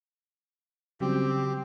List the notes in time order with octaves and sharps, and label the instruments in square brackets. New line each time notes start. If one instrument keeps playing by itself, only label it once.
[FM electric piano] C#3 F#3 G3 [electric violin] C4 [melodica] G4